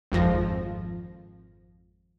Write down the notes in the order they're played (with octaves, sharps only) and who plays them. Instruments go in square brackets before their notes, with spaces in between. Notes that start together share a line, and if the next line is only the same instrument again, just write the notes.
[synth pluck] G#1 F2 F3 A#6